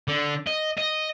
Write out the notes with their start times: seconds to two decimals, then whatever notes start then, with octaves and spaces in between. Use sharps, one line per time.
0.08 D3
0.47 D#5
0.77 D#5